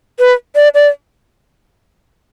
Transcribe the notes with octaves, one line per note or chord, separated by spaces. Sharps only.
B4
D5
D5